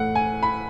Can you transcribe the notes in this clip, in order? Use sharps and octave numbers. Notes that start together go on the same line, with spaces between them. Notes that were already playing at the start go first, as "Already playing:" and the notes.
Already playing: A2 E3 A3 F#5
G#5
B5